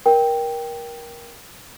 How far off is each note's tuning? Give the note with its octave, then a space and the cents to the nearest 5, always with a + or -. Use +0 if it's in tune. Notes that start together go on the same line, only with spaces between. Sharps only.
A#4 +20 G5 +0